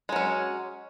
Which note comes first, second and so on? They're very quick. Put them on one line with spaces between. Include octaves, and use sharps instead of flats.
G#3 F#3 C#4